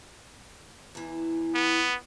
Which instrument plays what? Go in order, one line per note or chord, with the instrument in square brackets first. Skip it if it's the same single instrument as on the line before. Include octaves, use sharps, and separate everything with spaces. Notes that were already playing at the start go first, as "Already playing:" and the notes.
[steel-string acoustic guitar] E2 E3
[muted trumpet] B3